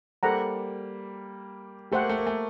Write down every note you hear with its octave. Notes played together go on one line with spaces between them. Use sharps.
G3 A#3 A4 C5 F#5 A#5
A3 G4 C5 F#5
A#3
A3
A#3
A3